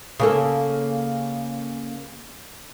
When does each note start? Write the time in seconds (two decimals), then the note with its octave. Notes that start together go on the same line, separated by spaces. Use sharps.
0.20 C#3 A#3 A4